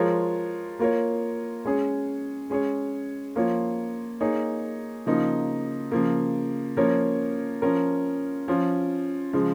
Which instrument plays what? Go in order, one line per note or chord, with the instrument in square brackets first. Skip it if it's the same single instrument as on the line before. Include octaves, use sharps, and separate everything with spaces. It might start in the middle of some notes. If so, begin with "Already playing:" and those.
Already playing: [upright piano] F3 G#3 F4 A#4 C#5
A#3 F4 A#4 C#5
G#3 C#4 G#4 C#5
G#3 C#4 G#4 C#5
F3 A#3 F4 C#5
A#3 D#4 G#4 C#5
C#3 F3 A#3 D#4
C#3 F3 A#3
F3 A#3 C#4 A#4 C#5
F3 C#4 A#4
F3 C#4 F4
C#3 F3 G#3